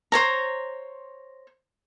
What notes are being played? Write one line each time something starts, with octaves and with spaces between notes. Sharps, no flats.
C5 C#5 A#5